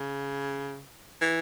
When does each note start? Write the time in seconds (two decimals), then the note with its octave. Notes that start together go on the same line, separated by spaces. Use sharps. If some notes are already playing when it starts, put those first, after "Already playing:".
Already playing: C#3
1.22 E3